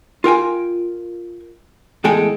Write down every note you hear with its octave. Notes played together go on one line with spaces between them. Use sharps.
F4 A#4 G5 G#5
E2 A2 G#3 A4 G5 G#5